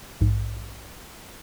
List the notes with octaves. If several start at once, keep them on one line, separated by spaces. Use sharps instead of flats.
A#1 G#2